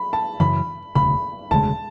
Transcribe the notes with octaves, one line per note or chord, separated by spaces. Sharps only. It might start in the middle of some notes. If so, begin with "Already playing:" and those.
Already playing: B5
A5
F#2 C#3 E3 B5
E1 D2 C#3 B5
E1 D2 C#3 G#3 A5